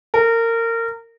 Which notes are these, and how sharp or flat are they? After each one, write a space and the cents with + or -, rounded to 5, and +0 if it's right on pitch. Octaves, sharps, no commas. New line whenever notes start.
A#4 -25